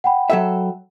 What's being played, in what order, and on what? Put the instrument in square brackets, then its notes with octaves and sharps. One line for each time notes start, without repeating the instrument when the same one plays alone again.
[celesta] F#5 G5 B5
[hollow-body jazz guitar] F#3 A4 E5